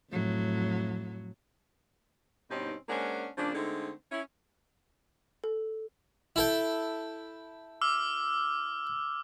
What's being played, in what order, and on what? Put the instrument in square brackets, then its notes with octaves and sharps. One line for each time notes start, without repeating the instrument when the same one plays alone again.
[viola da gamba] F2 A2 F#3
[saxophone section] G2 B2 C4 C#4 D#4
G#3 A#3 C#4 D4 C5 F#5
C#3 F3 A#3 D4
D3 G#3 A3 C4 D#4
C#4 E4
[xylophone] A4
[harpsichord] E4 A4 G5
[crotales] D6 E6 F6